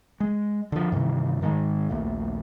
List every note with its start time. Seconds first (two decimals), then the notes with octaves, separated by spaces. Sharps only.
0.20 G#3
0.72 D3 F3
0.92 G2 C3 D#3 E3
1.41 G#2 D#3 E3 G#3
1.89 A#1 D#2 A3